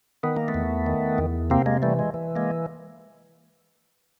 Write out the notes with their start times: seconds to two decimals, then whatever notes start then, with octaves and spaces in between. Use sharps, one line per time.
0.23 D#3 B3
0.37 A#3
0.48 A3 B3
0.54 E2
0.86 D#3
1.18 E2
1.50 C3 A#3 C4
1.66 G#3 A#3
1.82 E3 G3 A3
1.99 G#3
2.14 E3
2.36 G#3 A#3